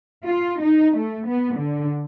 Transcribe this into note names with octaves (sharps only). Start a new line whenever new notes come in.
F4
D#4
A3
B3
D3